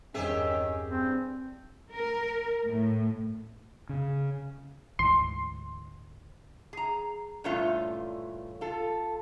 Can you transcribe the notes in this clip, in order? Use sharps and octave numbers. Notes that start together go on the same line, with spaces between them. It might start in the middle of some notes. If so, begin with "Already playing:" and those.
E2 G2 D#3 C4 C#4 G4 G#4 E5
G2 C4
A#4
A2
C#3
D2 G#2 E3 C6
G#4 A#5
G2 A#2 E3 A3 C#4 F4
F4 A4